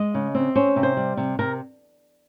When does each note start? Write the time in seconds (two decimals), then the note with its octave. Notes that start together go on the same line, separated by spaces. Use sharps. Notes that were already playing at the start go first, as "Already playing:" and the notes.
Already playing: G#3 D#5
0.14 C#3
0.35 C4
0.56 C#4 C5
0.76 C3
0.83 C5
0.97 G3
1.17 C3
1.39 C3 A#4